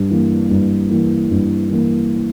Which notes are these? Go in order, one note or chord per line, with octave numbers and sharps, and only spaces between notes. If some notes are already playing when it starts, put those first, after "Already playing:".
Already playing: G2
E3 A#3
G2
E3 A#3
G2
E3 A#3